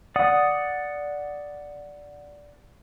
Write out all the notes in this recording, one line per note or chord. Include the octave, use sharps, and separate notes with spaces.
D5 F#5 D#6